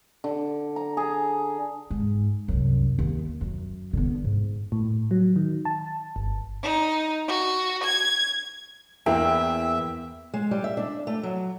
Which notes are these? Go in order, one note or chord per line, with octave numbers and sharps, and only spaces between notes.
D3
A#5
G#4
G#2
C2 F#2
D#2
F#2
D3 B3
G#2
A2
F#3
D#3
A5
G1
D#4
F#4
G#6
E2 A#3 E4 E5 G5
G#3
G3
E5
D4
A3
F#3